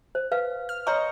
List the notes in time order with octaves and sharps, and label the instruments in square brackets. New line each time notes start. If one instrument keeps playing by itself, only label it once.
[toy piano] C5
B4 F5
[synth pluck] F6
[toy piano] C#5 A#5 C6 [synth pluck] D#5 C#6